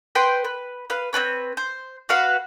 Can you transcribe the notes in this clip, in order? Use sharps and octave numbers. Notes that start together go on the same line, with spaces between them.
B4 C5 G5 C6
B4
B4 F5
C4 D4 B4 C#5
C5
F#4 B4 F5 F#5